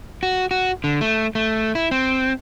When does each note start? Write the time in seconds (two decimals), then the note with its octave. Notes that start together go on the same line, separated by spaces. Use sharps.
0.23 F#4
0.51 F#4
0.84 D3
1.01 A3
1.35 A3
1.75 E4
1.91 C4